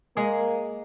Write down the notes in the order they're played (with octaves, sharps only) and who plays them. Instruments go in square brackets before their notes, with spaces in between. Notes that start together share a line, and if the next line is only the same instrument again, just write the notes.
[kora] G#3 G#4 [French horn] A#3